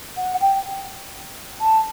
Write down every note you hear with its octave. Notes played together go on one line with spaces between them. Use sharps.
F#5
G5
A5